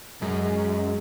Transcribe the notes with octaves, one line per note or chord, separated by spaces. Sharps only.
F#2 G#3